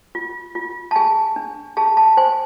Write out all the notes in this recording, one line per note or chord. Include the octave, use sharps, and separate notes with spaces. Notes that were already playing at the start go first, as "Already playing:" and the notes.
F4
F4
A5
G#4 G#5
D4
G#4 A5
A5
C5 G#5